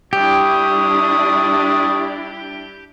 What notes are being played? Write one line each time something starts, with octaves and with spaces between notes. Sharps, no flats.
G3 D4 E4 G4 C#6 D#6